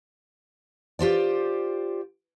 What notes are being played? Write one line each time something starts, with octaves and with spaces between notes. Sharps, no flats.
F4 G4 C5 D5